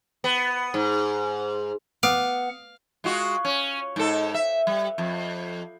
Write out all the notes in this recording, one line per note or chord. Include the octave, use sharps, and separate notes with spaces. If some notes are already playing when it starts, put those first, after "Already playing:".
B3
G#2
B3 F5 F#5 D6 D#6 D7
G#3 F4 F#4
C#4
G#2 A4
E5
G3
F2